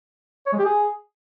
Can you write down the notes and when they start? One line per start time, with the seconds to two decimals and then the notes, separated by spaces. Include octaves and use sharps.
0.47 C#5
0.53 G#3
0.59 G4
0.65 G#4